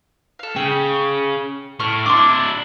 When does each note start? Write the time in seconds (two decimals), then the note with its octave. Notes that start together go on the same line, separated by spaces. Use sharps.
0.39 A4 F5
0.56 C#3 G5
1.80 A2 C#6 F6
2.06 D4 E4 C6 D6